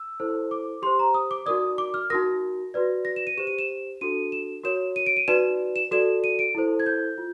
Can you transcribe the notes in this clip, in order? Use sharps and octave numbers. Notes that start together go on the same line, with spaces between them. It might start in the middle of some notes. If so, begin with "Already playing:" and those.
Already playing: E6
E4 A4 C5
D6
G4 C5 C6
A#5
D#6
D6
D#4 F#4 A#4 D5 D#6
D6
F6
D#4 F#4 A#4 A#6
F#4 B4 D5
A#6
E7
D#7
G4 C5 E7
D#7
E7
D4 F#4 A4 D#7
E7
F#4 A#4 C#5 E7
D#7
D7
D#7
D#4 F#4 B4 D5 E7
E7
F#4 A4 D5 E7
D#7
D7
E4 A4 C5
G#6
G6
F4